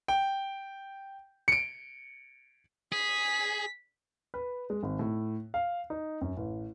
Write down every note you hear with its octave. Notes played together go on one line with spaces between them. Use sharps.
G5
C#7 D7
G#4 B6
B4
G#3
G#1
A2
F5
D#4
F#2
A1